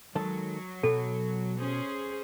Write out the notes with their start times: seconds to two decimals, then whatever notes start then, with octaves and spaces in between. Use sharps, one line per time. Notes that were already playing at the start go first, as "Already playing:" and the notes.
0.15 D#3 F#3 G#3 A4
0.83 B2 A4
1.59 C#4 G#4 C5